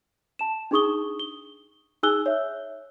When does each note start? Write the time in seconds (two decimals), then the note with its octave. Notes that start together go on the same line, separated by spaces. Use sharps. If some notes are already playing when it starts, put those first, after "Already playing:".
0.39 A5 E7
0.71 D4 D#4 G#4 C#6 D#6 G7
1.19 G7
2.03 D#4 G#4 G#5 E6 F#6 G7
2.26 C#5 E5